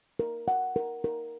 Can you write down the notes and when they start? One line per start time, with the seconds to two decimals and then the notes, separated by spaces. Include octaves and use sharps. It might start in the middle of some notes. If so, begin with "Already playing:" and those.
0.19 A#4
0.48 F#5
0.76 A#4
1.04 A#4